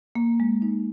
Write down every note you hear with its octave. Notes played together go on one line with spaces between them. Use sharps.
A#3
G#3
D#4